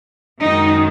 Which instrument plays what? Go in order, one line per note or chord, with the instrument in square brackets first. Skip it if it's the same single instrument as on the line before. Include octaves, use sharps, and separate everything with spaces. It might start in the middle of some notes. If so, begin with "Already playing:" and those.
[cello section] F#2 D#3 G#3 D#4